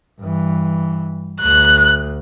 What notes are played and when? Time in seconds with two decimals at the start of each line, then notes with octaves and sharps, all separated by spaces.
0.20 G2 E3
1.42 D2 F#6